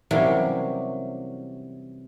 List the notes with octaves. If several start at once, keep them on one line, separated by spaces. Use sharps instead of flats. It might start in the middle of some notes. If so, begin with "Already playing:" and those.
C3 E3 F#3 G3 A#3 C#4